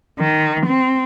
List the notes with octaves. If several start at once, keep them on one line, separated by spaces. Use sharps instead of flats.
D#3
C4